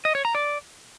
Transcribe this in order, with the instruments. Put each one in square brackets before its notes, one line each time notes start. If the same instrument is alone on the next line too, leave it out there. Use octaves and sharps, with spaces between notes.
[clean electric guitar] D#5
C#5
A#5
D5